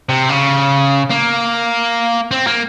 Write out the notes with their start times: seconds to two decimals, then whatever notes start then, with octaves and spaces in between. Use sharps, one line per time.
0.09 C3
0.29 C#3
1.10 A#3
2.31 C4
2.47 A#3